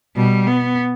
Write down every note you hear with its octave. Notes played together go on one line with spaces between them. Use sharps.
B2 G3
B3